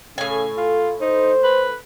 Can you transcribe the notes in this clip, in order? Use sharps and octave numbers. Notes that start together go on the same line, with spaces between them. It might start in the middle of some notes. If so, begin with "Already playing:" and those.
A2 C#3 G#5
F4
D#4 C5
B4